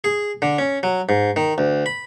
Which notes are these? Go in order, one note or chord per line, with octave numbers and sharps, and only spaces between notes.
G#4
D3
C#4
F#3
G#2
D#3
D2
B5